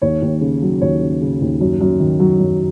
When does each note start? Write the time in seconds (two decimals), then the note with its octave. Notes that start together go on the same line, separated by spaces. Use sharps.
0.02 D#2 C#5
0.22 D#2
0.41 C#3
0.62 F#3
0.81 D#2 C#5
1.01 C#3
1.22 C#3
1.41 D#2
1.60 F#2
1.81 F#2
2.00 D#3
2.20 F#3
2.39 F#2